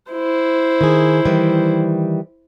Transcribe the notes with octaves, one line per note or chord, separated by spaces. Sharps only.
E4 C5
D#3 G#4
D#3 E3 G3